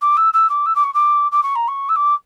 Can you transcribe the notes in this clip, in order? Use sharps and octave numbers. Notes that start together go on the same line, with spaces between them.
D6
E6
E6
D6
E6
D6
C#6
D6
D6
C#6
A#5
C#6
E6
D6